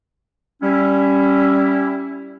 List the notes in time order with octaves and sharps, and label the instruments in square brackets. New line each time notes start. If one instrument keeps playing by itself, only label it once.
[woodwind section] G3 C#4 E4